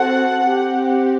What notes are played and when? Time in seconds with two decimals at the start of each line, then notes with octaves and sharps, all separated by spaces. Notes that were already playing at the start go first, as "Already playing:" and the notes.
Already playing: C4 F#4 A4 F#5
0.44 C4 G4